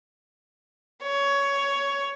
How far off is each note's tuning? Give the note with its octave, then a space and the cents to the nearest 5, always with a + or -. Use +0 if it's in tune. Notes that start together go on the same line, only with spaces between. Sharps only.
C#5 +15